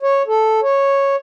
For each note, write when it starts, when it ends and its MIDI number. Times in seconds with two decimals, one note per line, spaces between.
0.03 0.22 73
0.27 0.60 69
0.62 1.16 73